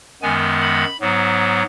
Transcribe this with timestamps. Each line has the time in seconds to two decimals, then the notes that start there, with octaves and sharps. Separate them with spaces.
0.22 F#2 D#3 G#3 B3 G#5
0.62 B5
1.01 G#2 F#3 B3